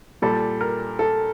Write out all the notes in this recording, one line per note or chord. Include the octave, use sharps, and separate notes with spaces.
A#2 G3 A4
A#4
A4